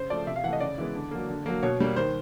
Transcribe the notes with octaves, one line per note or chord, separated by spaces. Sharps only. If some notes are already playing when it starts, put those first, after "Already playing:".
Already playing: C#3 C5
F3 A3 D5
C3 E5
F5
E3 A3 F#5
D#5
C#3 D5
E3 G#3 B3
D3
F#3 A#3
D3
F#3 A#3
B2 C#5
G3 A#3
D#3 C5